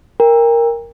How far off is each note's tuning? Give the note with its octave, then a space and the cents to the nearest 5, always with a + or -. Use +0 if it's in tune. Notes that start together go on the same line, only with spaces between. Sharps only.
A#4 +0 G5 +35